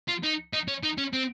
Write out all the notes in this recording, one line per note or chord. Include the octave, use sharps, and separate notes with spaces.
F4
D#4
D#4
C#4
D#4
C#4
C4